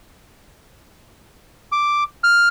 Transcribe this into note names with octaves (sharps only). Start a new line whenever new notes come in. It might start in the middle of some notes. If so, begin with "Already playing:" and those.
D6
F6